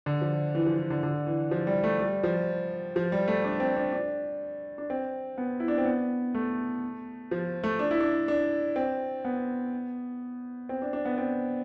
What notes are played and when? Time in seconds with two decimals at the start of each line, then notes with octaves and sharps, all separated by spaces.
0.06 D3
0.21 F3
0.55 E3
0.66 F3
0.78 E3
0.90 D3
1.03 D3
1.27 E3
1.51 F3
1.67 G3
1.84 A3
2.00 G3
2.23 F3
2.96 F3
3.12 G3
3.28 A3
3.44 D4
3.60 C4
3.76 D4
3.92 D4
4.78 D4
4.90 C4
5.38 B3
5.60 E4
5.68 D4
5.78 C4
5.85 B3
6.35 A3
7.31 F3
7.64 A3
7.79 D4
7.91 E4
8.00 D4
8.28 D4
8.76 C4
9.25 B3
10.69 C4
10.82 D4
10.93 D4
11.05 B3
11.18 C4